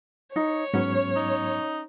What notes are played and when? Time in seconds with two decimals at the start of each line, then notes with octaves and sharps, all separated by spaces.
0.36 D#4 C#5
0.74 G#2 F#3 B3 C#4
1.15 D#4